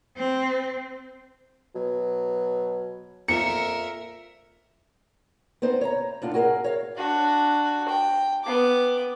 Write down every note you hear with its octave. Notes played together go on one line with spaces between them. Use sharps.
C4
B2 F#3
F2 A#2 A#4 E5 C#7
B3 C4 D#4 C5
C#5 E5 F5 A#5
A2 D4 F4 F#5
F#4 G#4 A#4 E5 F5
C#5 E5 F5
D4 F#4
G5
B3 D6